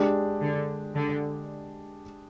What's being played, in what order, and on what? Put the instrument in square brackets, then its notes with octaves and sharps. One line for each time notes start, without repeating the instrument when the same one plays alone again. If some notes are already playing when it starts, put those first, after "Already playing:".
Already playing: [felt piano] G#3 D4 G4
[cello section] D3
D3